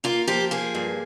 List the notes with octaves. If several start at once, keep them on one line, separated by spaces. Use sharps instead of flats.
A#3 F4
F3 G4
A#3 G#4
G2